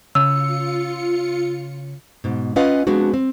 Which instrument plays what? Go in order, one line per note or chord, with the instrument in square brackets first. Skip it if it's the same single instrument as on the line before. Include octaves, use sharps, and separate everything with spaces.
[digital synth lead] C#3 [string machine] F4 C#7 [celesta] E6
[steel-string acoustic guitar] G#2 B2
C#4 F4 B4 D#5 F5 F#5
F3 G#3 B3 C4 D4 F#4
C4